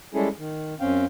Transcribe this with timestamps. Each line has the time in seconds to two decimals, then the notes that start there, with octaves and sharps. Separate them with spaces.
0.14 G3 G#3 C#4 E4 G#4 A4
0.38 D#3
0.80 F#2 C4 C#4 F5 G5